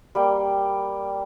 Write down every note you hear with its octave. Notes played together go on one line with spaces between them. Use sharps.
G3 A#3 G5